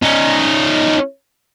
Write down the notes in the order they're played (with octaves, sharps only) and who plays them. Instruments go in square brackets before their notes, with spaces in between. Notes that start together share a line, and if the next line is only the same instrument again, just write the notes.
[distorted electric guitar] C#4 D#4